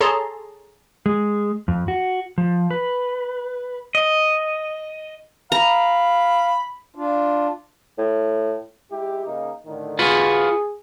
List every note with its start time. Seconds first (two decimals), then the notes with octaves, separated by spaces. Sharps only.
0.01 G#4 A4 C#5 A5 A#5 C6
1.06 G#3
1.68 F2
1.88 F#4
2.38 F3
2.71 B4
3.95 D#5
5.52 F5 A#5 B5
6.95 D4 F4
7.98 A2
8.91 G#3 E4 G4
9.26 C#3 A#3 D#4
9.65 A2 D3 D#3
9.99 F4 F#4 G#4 B4